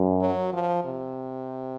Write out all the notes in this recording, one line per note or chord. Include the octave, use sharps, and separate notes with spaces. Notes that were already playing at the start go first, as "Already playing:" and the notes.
Already playing: F#2
F#3
F3
C3